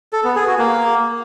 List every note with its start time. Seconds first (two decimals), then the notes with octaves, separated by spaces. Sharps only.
0.13 A4
0.24 B3
0.36 G#4
0.47 F#4
0.58 A#3